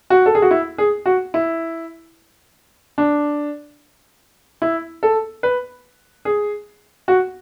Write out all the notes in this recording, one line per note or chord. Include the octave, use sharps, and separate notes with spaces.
F#4
A4
G#4
F#4
E4
G#4
F#4
E4
D4
E4
A4
B4
G#4
F#4